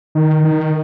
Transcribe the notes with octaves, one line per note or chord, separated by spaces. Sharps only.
D#3
D#3